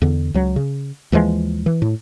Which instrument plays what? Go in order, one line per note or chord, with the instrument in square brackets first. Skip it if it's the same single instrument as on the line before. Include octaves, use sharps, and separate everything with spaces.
[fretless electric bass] E2 D3
C#2 F#3
C#3
D#2 E3 F3 G#3
E3
A2